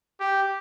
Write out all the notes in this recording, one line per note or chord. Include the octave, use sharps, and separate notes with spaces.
G4